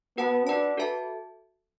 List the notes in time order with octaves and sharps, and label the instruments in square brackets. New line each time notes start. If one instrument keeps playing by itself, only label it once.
[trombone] B3 [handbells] F#4 B4 F#5 A5
[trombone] D4 [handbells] F#4 B4 F#5 A5
[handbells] F#4 A4 E5 A5